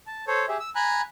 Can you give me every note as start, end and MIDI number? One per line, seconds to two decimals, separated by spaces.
0.07 0.25 81
0.27 0.46 69
0.27 0.46 72
0.27 0.46 73
0.48 0.57 67
0.48 0.57 68
0.48 0.57 76
0.60 0.70 88
0.75 1.01 80
0.75 1.01 82
0.75 1.01 83
0.75 1.01 90